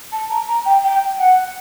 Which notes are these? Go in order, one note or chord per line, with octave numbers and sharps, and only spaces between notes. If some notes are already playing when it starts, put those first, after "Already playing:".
A5
A#5
A#5
G5
G5
F#5